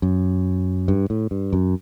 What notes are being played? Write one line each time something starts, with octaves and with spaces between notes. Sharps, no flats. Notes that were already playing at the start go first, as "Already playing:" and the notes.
F#2
G2
A2
G2
F#2